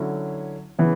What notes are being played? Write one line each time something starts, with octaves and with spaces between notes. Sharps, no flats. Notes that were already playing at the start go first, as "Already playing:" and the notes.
Already playing: D3 F#3 C#4 E4
C#3 E3 B3 E4